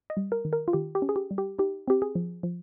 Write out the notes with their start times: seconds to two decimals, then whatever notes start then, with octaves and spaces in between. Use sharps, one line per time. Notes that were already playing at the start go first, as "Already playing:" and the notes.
0.10 D#5
0.17 G3
0.32 A#4
0.45 D#3
0.53 A#4
0.68 F4
0.73 D#3 G4
0.95 G4
1.02 C#4
1.09 G#4
1.16 G4
1.31 G3
1.38 G4
1.58 D#4 G4
1.88 C4 G4
2.02 G#4
2.15 F3
2.43 F3